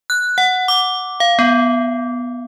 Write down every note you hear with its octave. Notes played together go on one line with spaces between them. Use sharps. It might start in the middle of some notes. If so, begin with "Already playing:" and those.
F#6
F#5
D6
F5
B3